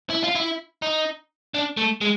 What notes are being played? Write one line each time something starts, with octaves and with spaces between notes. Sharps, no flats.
E4
F4
E4
D#4
D4
A3
G#3